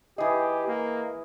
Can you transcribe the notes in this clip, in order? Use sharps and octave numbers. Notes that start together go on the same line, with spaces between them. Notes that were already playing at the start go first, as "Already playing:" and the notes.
E3 G4 G#4 D#5
A#3